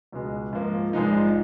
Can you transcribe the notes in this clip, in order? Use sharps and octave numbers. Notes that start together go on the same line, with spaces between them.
C#2 B2 G#3
G#2 F3 A#3
A#1 G#2 F3 G#3 D#4